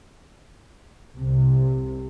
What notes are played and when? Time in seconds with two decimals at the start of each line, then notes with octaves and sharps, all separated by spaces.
1.16 C2 C3